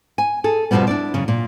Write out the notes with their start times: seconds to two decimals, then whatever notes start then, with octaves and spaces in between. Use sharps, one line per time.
0.18 G#5
0.44 G#4 A4
0.71 F2 B2 D#3 F3 G3 B3
0.88 D4 E4 D5
1.14 F#2 C#3
1.28 A#2